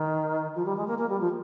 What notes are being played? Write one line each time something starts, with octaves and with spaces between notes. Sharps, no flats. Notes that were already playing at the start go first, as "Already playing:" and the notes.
Already playing: D#3
F3
G3
G#3
A#3
A#3
G3
F3